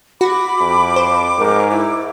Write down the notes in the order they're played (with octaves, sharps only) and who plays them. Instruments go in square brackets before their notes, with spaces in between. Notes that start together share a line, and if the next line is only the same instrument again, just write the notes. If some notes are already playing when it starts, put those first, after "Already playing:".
[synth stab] F#4 [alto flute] B5 [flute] D6
[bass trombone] F2
[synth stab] C5
[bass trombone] G#2 [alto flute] A#4
[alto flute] E4